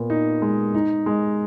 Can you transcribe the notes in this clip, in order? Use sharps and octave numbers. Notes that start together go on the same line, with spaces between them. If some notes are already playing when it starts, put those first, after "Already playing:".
Already playing: A#2 B3
D#4
G#3
D#4
G#3